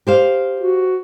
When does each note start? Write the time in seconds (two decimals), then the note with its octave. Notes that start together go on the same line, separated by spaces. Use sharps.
0.07 G4 C5 F5
0.60 F#4